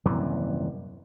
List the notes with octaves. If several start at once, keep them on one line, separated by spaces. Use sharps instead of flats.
D#1 F#2 C3 E3